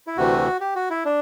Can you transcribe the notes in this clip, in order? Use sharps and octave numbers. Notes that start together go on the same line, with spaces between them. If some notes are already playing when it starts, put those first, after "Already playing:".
E4
D2 C3 E3 A3 F#4
G4
F#4
E4
D4